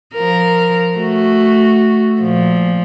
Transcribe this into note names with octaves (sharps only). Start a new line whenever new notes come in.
F3 A#4
A3 F#4
A#2 F3